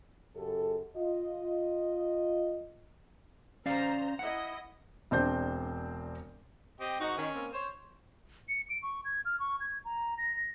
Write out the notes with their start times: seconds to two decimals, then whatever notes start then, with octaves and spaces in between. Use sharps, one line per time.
0.35 F#2 C#3 G4 A4
0.97 F4 D#5
3.66 C#4 C5 D5 F5 A#5
4.19 E4 D#5 F#5
5.11 E1 C4 D4 C5 G6
6.80 C4 G4 D#5
7.00 G#2 D#4 F#4 C#6
7.18 D#3 C#4
7.34 A#3 C4
7.53 C5 C#5
8.49 C#7
8.70 D7
8.83 C#6
9.05 G#6
9.25 F6
9.40 C#6
9.60 G#6
9.85 A#5
10.18 A#6
10.36 A#6